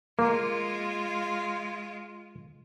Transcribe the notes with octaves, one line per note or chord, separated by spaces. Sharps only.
G#3 A#3 F4